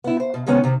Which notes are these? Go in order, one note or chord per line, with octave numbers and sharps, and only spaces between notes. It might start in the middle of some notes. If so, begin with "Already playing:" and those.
B3 E4
C5
B2
C3 D#3 G#3 B3 C#4
C3 D#3